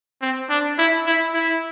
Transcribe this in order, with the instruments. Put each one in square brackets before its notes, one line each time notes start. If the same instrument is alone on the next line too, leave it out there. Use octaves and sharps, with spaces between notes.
[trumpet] C4
D4
E4
E4
E4